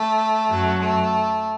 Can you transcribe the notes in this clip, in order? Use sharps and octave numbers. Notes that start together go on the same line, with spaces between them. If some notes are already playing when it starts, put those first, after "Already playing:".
Already playing: A3
F#2 F#3
A3